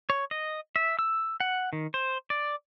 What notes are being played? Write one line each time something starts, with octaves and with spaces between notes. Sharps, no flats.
C#5
D#5
E5
E6
F#5
D#3
C5
D5